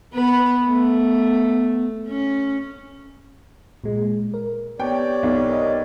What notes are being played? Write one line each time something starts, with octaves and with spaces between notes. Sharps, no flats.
B3 B4
A3 B3
C#4
A#2 G#3
A#4
B3 G4 C#5 D5 G5
B1
A#4 D#5